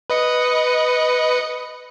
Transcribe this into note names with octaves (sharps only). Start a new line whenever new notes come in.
B4 D#5 C#7